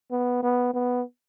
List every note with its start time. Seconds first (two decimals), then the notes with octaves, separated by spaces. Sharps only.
0.11 B3
0.43 B3
0.74 B3